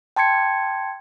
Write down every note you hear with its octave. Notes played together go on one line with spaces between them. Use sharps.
G5 A5 C6 G#6 C#7